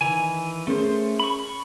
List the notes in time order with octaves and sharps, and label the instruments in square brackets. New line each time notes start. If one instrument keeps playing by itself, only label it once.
[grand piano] D#3 [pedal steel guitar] E3 G#5
[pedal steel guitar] A3 C5 [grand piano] C#4 G#4 A#4
[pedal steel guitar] B5 C#6